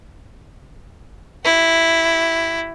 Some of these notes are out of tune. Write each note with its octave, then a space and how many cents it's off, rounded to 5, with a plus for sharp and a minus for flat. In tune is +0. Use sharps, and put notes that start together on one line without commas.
E4 +0 G4 -45